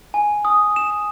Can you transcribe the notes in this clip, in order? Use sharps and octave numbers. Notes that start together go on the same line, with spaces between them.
G#5
D#6
E7